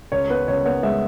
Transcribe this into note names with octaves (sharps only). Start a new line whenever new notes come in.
C#2 C#5
B3 B4
C#2 C#5
B3 C#5
G#3 E5